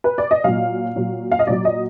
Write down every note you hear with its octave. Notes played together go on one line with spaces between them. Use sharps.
B4
D5
D#5
A#2 F#3 F5
A#2 F#3
F5
D#5
A#2 F#3 D5
D#5